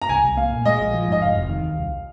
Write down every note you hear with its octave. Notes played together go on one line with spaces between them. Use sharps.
A#5
C2 G#5
C2
A#3 F5
A#2
G#3 D#5
A#1
F3
G#2 D#5
F1 F5
F1
D#3
D#2
C2